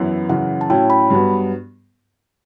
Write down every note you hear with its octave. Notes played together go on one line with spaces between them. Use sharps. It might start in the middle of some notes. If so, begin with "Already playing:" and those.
Already playing: F#2 E3 B3 E4
F#2 C#3 E3 F#5
A5
A2 F#3 C#4 E4 G5
B5
G2 F#3 B3